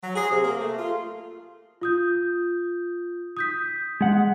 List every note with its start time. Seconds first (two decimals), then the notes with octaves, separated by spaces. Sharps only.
0.02 F#3
0.15 G#4
0.30 C3
0.44 A#3
0.60 A3
0.79 F4
1.81 F4 D#6 G6
3.37 D#6 G6 B6
4.01 G#3 F#5